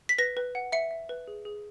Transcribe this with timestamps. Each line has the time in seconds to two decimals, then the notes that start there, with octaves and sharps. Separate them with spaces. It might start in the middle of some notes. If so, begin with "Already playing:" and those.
0.09 B6
0.18 B4 A#6
0.37 B4
0.55 F#5
0.72 E5 C#7
0.91 E5
1.09 B4
1.27 G#4
1.45 G#4